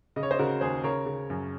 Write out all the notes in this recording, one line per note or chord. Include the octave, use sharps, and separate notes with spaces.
C#3 D#5
C#5
C5 D#5
C#3 F#4 A#4
D#2 G#4 C5
C#3 A#4 C#5
C#3
F#2